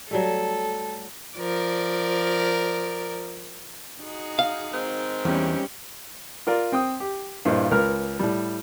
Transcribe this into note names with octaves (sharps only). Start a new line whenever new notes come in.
F#3 G3 A3 A4
F3 A#4 D5
D#4 F#4 G#4
F5
D#3 G#3 C4
E2 G3 C#4 G4
F4 A#4 D5
C4 G5 D#6
G4
G2 A#2 E4 F4 C5 D#5
C#2 A#4 B4 F6
A2 G3